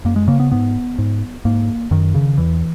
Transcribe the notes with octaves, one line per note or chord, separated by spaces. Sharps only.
F#2 A#3
G#3
C#3 A#3
B3
G#2 B3
G#2
G#2 A#3
F#2 D#3
C#3
E2 E3